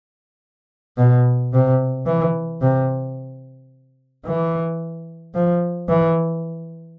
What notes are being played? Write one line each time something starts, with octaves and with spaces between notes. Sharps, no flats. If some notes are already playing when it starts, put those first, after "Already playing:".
B2
C3
E3
C3
E3
F3
E3